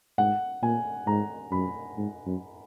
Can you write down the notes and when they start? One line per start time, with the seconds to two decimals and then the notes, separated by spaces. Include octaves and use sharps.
0.18 G#2 F#5
0.62 A#2 G#5
1.07 G#2 A#5
1.51 F#2 B5
1.97 G#2
2.26 F#2